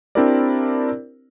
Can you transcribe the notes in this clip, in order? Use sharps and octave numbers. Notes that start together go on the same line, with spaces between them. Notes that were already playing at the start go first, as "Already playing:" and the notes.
C4 D4 E4 G4 A#4 D5